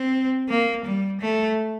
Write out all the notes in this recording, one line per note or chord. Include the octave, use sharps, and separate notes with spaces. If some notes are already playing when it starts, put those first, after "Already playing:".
Already playing: C4
A#3
G3
A3